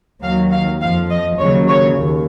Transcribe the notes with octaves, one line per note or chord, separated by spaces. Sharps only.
D#2 D#3 F#3 F5
F5
F2 F3 F5
D#5
D#2 C#3 F#3 C#5
C#5
D#2